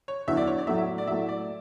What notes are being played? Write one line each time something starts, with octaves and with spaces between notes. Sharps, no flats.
C#5
E2 D3 F#3 E5
D5
C#5
D5
A2 F#3 A3 E5
E5
D5
A2 F#3 A3 E5
D5